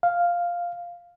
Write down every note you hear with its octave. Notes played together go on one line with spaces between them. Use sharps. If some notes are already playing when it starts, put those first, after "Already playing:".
F5